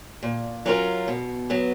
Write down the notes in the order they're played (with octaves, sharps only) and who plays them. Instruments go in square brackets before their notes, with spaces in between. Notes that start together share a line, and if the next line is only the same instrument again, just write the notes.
[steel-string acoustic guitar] A#2
F#3 C#4 F4 A#4
B2
F#3 B3